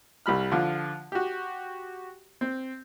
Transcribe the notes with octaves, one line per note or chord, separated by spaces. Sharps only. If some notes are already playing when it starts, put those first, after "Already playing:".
C2 G3 B5 F6
D3 F3 F4
F#4 G4
C4